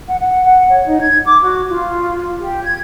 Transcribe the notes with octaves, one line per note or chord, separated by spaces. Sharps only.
F#5
F#5
F#5
C#5
D#4
G#6
D6
F#4
F4
G4
G#6